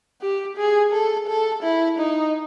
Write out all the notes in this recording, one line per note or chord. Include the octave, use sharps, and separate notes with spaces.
G4
G#4
A4
A4
E4
D#4